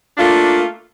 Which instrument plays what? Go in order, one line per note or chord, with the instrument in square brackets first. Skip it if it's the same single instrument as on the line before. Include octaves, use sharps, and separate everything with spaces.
[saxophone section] A3 A#3 D4 F4